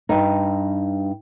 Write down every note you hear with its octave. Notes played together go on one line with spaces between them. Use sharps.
G2 D#4